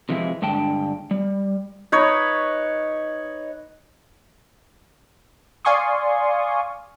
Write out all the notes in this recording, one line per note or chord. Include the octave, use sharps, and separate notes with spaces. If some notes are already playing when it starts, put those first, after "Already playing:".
C3 E3 F3 G#3 E4
G2 D3 G#3 G5 A5
G3
D#4 B4 C#5
D5 F5 G#5 C6 C#6 D#6